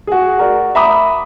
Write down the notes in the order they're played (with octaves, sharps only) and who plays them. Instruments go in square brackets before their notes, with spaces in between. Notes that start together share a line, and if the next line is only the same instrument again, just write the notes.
[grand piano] F#4 G#4
F#4 A#4 D5
E5 A#5 B5 D6 D#6